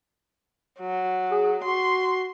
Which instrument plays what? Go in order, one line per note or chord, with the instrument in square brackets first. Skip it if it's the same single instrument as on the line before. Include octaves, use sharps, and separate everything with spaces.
[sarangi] F#3
[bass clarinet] G#4
[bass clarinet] F#4 [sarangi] C6